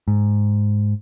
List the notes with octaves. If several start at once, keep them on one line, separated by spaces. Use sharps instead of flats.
G#2